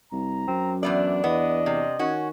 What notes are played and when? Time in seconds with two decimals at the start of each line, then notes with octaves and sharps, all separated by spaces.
0.12 C2 A#5
0.48 F#2 C4
0.83 E2 B3 D4 D5 E5
1.24 E2 B3 D#5
1.66 C3
1.99 D#3 C#4 F#4